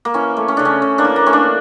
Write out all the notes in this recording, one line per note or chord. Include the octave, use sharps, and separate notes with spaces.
A#3
E3 C#4
A3
C#4
C#3 D4
C#4
C#3
A#3 D4
E3
A#3
A3 C#4
A#3 D4